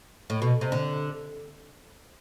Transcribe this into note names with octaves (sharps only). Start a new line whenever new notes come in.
A2
B2
C3
D3